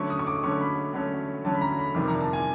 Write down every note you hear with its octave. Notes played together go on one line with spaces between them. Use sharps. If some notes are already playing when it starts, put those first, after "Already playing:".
Already playing: D3 F#3 A3 C#4 C#6
D#6
C#6
D6
D3 F#3 A3 C#4 C#6
B5
D3 F#3 A3 C#4
D3 F#3 A3 C#4 A5
B5
A#5
B5
F2 C3 D#3 G3
A#5
A5
G#5